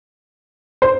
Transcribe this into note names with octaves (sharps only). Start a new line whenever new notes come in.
C5